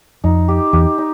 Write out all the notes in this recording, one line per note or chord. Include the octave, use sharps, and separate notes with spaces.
F2 D#4
G4
E2 G4
D#4